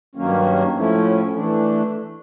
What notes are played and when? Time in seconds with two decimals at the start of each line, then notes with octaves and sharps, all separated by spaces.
0.15 G2 D#3 F#3 A#3 C#4
0.75 A2 F3 A3 C#4 E4
1.34 E3 A3 D4